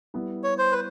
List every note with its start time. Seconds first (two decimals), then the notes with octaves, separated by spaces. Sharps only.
0.14 G3 B3 E4
0.44 C#5
0.58 C5
0.72 B4